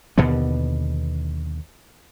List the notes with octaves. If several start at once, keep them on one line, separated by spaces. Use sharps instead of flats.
D#2 B2 D3 B3